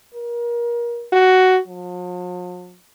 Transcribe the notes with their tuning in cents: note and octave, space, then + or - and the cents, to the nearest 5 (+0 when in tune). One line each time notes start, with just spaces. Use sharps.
A#4 +30
F#4 +10
F3 +45